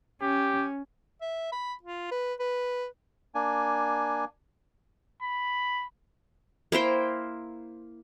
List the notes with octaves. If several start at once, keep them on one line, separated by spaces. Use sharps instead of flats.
C#4 G4
E5
B5
F4
B4
B4
A#3 D4 G#5
B5
A#3 E4 C5 G5